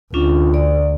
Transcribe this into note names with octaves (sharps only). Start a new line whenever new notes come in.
D2 C#4 D4 F4
D5